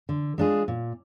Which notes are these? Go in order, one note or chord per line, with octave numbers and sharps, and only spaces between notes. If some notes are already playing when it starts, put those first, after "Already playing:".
D3
G#3 D4 F4 G#4
A#2